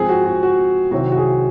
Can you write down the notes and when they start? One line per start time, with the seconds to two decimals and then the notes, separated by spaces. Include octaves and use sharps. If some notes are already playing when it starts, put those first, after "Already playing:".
Already playing: G#2 F3 C4 G#4
0.09 F#4
0.25 F#4
0.43 F#4
0.91 C2 C3 D#3 F#3 C4 F#4
1.12 F#4
1.17 G#4